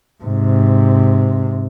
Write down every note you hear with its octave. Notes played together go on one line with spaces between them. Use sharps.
G#2 C3